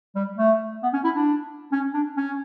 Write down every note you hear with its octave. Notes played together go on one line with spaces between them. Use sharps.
G3
A3
B3
C#4
E4
D4
C#4
D4
C#4